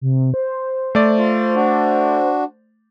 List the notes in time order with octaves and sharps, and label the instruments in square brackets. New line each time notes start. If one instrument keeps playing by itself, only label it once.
[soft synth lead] C3
C5
[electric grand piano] A3 D5
[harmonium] F4
D4 F#4